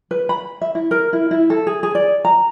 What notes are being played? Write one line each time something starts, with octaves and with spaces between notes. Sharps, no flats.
B4
B5
E5
E4
A#4
E4
E4
A4
G#4
G#4
D5
A#5